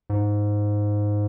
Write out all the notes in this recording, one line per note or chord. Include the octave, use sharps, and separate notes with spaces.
G#2